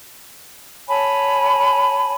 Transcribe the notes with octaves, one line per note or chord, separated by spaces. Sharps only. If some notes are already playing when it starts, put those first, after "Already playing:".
C#5 G#5 A5 B5